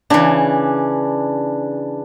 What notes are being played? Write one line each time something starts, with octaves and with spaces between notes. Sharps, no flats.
C#3 E3 D4